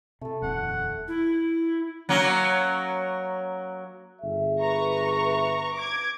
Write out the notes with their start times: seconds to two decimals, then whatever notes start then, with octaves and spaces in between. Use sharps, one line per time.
0.21 C3 A3 A4
0.42 D#1 F2 F#5
1.08 E4
2.09 F#3 A#3 C#4
4.22 G1 G#4 E5
4.60 B4 A#5 C#6
5.75 D6 G#6